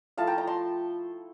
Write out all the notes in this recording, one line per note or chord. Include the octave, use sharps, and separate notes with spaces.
F3 A3 E4 F5 A5
G5 A#5
G5 A#5
A5 C6